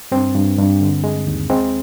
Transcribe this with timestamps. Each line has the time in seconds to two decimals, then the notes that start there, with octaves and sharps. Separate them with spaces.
0.11 G2 C4
0.35 G2
0.58 G2
0.81 D3
1.04 G#3
1.27 D#2
1.50 G#3 C4